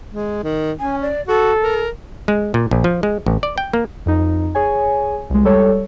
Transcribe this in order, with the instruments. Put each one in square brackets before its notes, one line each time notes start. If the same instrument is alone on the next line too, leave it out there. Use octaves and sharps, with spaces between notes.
[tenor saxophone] G#3
D#3
[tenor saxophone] C#4 [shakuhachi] G#5
[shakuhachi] D5
[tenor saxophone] F#4 [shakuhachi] A4
[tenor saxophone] A#4
[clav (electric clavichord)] G#3
A#2
A#1
F3
G#3
A1
D5
G5
A#3
[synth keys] F2 D#4
G#4 C#5 G#5
C2 G#3
G3 A4 C#5